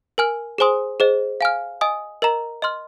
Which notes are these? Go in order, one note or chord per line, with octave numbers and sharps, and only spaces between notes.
A#4 G#5 F6
G#4 C5 G#5 C6 D#6
G#4 C5 D#5
F5 G#5 F6
D#5 G#5 D#6
A#4 D#5 A#5
D#5 C6 F6